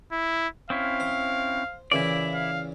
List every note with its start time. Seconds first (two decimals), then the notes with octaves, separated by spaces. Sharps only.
0.12 E4
0.70 C4 C#4 E4 F5
1.00 C5
1.92 A#2 C#3 E3 E4 D5
2.34 F5